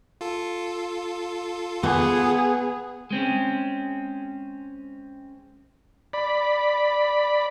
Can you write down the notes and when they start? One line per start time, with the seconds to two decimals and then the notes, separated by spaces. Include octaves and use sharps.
0.21 F4 A4
1.83 B3 G#4
3.11 G#3 C4 C#4
6.13 D5 B5